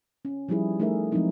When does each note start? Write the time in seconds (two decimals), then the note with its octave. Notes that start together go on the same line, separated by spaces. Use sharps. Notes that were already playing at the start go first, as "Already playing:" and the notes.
0.25 C#4
0.49 F3 G3 D#4 E4 G#4
0.80 A3 D#4 G#4 A#4 E5
1.12 F3 F#3 G#3 C4 D#4 E4